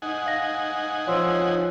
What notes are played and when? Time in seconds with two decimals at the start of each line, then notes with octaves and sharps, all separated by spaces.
0.02 D#4 F#5 G#5
0.27 F5 A#6
1.07 F3 C#5 C6 E6